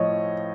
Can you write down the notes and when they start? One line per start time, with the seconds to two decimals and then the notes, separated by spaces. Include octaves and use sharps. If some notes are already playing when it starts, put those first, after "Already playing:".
Already playing: A2 F3 C#5 D#5